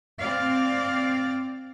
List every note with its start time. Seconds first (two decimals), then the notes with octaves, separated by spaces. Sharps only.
0.20 C4 D5 F5